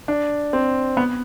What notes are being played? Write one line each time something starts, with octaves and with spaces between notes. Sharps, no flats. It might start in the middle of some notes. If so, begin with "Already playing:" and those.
D4
C4
B3